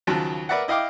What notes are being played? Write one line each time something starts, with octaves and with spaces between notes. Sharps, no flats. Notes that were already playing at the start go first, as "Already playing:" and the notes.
D#2 C#3 F3 F#3 A5
A#4 B4 D5 E5 F#5
E4 D#5 F5 G5 D6